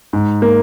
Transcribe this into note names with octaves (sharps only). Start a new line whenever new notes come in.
G#2
A#3